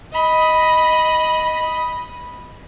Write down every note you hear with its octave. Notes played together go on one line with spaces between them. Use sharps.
D#5 B5